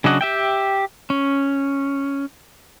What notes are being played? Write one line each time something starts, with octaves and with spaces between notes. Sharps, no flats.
C#3 F#3 D4 D#5 F#5
G4 E5 G5
C#4